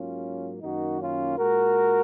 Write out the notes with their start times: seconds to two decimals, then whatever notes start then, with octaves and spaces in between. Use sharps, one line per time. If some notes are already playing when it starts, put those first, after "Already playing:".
Already playing: G#2 F#3 A#3 C#4 F4
0.62 F#2 D#3 A#3 D#4 F#4
1.00 C#4 F4
1.38 A#2 G#3 F#4 A#4